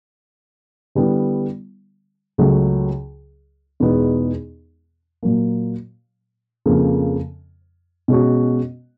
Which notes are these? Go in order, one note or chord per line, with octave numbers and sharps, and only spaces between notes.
D3 G3 B3 E4
C#2 C#3 F#3 A3 C#4
E2 B2 G#3 B3 D#4
A#2 F#3 A#3
F2 C#3 F3 A#3
B2 G#3 C#4 F#4